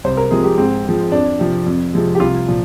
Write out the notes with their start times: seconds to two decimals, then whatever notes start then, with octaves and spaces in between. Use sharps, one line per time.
0.04 C2 C5
0.17 A#4
0.31 C3 F3 G#3 G#4
0.44 G4
0.58 G#2 C4
0.85 F3 G#3
1.12 F2 D4
1.39 C3 F3
1.66 F2
1.93 C3 F3 G#3
2.15 G4
2.20 C2 F4
2.48 A#2 F3